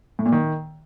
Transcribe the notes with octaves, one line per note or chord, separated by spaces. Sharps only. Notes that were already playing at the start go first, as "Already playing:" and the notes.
A2
A#2
D#3